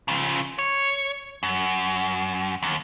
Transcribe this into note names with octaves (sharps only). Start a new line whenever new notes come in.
C#3 F3
C#5
F#2
D#2